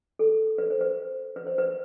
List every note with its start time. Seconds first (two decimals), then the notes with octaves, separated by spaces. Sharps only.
0.19 A4
0.58 B4
0.70 C5
0.81 B4
1.36 B4
1.47 C5
1.58 B4